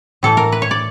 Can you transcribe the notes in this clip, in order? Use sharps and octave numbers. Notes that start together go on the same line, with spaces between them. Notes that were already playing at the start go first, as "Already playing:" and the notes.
A2 E3 A3 A4
A#4
B4
C#5
D5